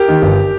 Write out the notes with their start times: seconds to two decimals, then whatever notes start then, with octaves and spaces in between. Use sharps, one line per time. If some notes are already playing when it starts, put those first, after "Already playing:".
Already playing: G4 A#4
0.08 D#3
0.22 G1